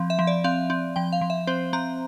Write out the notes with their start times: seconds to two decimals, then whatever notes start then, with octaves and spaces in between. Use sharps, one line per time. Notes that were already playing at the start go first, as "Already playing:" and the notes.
Already playing: F3 C4
0.10 E5
0.19 F3
0.27 D5
0.44 C4 F5
0.70 C4
0.96 F3 G5
1.12 F5
1.21 F3
1.30 E5
1.47 C4 C5
1.73 C4 A#5